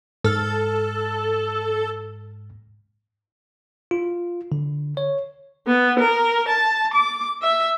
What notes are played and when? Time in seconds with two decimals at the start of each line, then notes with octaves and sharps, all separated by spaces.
0.24 G#2 A4 F6
3.91 F4
4.52 D3
4.97 C#5
5.67 B3
5.99 A#4
6.48 A5
6.94 D6
7.42 E5